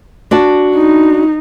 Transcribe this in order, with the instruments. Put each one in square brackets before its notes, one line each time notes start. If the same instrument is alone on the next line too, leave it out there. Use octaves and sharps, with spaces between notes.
[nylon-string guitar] D4 F#4 A5
[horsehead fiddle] D#4